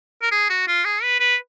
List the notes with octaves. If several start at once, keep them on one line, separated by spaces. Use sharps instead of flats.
A#4
G#4
F#4
F4
G#4
B4
B4